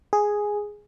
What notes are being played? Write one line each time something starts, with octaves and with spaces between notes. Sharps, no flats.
G#4